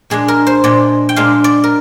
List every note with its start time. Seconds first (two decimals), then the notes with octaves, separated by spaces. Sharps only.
0.10 A#2 G#3 D4 G#4
0.28 A#4
0.47 C5
0.64 A#2 G#3 D4 D5
1.09 G5
1.16 A#2 G#3 D4 F5
1.44 D5
1.64 A#4